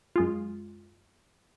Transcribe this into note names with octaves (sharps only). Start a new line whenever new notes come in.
F#2 G#3 F4